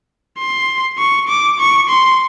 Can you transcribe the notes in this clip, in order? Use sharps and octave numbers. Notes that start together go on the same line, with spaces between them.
C6
C#6
D6
C#6
C6